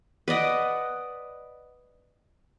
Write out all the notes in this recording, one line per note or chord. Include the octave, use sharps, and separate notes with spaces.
B4 D5 D#5 F#5